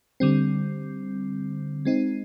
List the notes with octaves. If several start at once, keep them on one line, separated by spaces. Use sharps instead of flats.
D3 G3 C4
G#3 C4 D#4